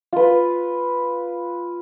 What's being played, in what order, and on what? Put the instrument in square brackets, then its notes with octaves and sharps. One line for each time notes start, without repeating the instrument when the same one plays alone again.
[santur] F4 B4